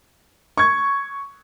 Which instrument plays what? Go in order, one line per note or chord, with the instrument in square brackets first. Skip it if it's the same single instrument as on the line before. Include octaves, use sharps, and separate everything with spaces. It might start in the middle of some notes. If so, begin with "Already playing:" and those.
[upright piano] C#6 G#6